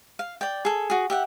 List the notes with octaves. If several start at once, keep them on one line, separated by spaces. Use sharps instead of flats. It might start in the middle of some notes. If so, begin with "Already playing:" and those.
F5
D5 G5
G#4 A4
F#4 G#4
G4 E5 F#5